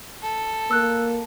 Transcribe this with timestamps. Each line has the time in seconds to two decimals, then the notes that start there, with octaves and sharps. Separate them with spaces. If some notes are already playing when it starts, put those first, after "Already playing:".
0.22 A4
0.71 A#3 E6 F#6